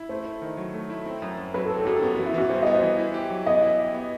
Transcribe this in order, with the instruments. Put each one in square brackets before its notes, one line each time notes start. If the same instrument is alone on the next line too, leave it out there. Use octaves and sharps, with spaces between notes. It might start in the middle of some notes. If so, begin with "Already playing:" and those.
Already playing: [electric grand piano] E4
[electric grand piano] A3 [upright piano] C5
[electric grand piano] E4
D#3
F#3
A3
E4
C4
F#2
F#2
[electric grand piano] F#3 [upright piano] B4
[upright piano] A4
[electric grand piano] C4
[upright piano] A4
[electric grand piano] F#2 [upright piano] F#4 G4
[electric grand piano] B3 [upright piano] F#4
[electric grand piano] E3 [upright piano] F#4
[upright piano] E4
[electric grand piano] E3 [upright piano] F#4
[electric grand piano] G3 [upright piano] C5
[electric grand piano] B3 [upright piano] D#5
[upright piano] C5
[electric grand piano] E3
E4
G4
F#3
[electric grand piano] B3 [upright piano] D#5
[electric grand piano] E4
G4
B3